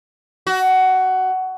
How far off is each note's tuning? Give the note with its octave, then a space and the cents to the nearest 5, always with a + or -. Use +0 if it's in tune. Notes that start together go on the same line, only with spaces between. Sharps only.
F#4 +15